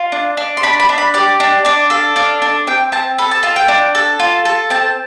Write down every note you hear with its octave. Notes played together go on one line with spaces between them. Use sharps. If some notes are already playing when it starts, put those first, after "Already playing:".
Already playing: F4
D4
D4
C6
D4 B5
B5
D4
B5
G4 D5
D4
D4 D5
A4 F5
D4 F5
D4
C4 G5
C4 A5
A4 B5
A5
F4 A5
G5
D4
A4
F4
A4
C4 A5